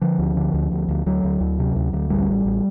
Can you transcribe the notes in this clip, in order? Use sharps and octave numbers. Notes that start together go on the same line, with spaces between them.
D3 F3
D2
D3
D2
D2
D2
D2 F#3
D2
D2
C3
D2
D2
A1 G3
A1
A1